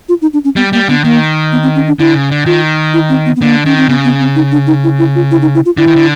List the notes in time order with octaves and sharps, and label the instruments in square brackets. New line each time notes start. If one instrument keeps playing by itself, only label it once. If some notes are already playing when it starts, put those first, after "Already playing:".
[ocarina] F4
D#4
D4
C#4
[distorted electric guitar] G3 [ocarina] B3
[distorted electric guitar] G3 [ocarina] A#3
[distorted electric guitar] D3 [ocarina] B3
[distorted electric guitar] D#3 [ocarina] A#3
[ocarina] B3
C4
C#4
D4
[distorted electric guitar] D3 [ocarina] E4
[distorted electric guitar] C#3
D3
[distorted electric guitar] D#3 [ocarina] F4
[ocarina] E4
C4
B3
B3
[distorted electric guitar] D3 [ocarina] A#3
[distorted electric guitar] D#3 [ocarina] C#4
[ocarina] C4
[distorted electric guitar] C#3 [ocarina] B3
[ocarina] B3
C4
D#4
D4
D#4
E4
E4
F4
E4
D#4
E4
F4
[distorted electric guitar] D3 [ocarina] E4
[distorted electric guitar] D#3
D3